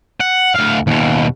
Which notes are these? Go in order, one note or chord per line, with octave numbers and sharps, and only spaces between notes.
F#5
D2 F5
D#2 B2